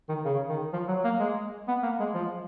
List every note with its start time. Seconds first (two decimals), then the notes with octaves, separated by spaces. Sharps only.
0.09 D#3
0.25 C#3
0.49 D#3
0.73 F3
0.88 F#3
1.04 A#3
1.19 G#3
1.68 B3
1.83 A#3
2.00 G#3
2.14 F3